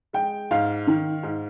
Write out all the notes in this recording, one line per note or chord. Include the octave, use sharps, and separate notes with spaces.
G#3 G5
G#2 F5
D#3
G#2